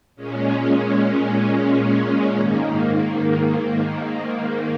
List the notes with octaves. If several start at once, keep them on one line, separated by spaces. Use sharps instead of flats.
A#2 G#3 C#4
G#2 D#3 A#3